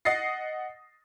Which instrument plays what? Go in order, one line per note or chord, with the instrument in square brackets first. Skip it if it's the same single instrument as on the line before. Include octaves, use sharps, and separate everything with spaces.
[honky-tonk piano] D#5 F#5 D#6 A6 A#6 C7